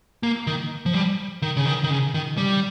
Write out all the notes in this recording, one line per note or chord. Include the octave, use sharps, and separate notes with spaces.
A#3
D#3
F3
G3
D#3
C#3
D#3
D#3
C#3
D#3
G3